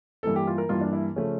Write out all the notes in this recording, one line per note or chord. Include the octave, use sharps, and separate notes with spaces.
G2 E3 A#3 A4
G4
F4
A#4
G2 E3 A#3 F4
D4
E4
C#3 F3 A3 C#4